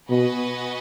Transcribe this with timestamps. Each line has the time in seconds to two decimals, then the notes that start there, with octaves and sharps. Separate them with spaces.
0.09 B2 B3 F#4 B4 D#5 G#5